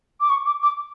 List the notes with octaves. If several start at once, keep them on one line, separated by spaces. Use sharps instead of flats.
D6
C#6
D6
D6